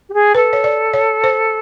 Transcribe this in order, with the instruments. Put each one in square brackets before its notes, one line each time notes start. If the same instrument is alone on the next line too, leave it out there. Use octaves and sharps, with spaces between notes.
[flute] G4
G#4
[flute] A4 [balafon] B4
[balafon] C#5
D5
C#5
C5